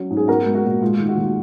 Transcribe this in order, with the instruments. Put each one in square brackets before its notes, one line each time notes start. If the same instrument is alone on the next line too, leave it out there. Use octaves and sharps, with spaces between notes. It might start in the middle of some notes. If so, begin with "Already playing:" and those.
Already playing: [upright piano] F#3 C#4
G#2
G#4
B3 F#4 A#4
G#3
F#4
A#2
G#3 F4
D#3
F#4
D#2